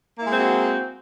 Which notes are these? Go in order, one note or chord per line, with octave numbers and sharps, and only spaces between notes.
G#3 A#3 C4 E4 F#4